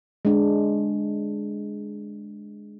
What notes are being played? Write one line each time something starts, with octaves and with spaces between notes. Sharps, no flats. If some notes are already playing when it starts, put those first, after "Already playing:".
G#3 D4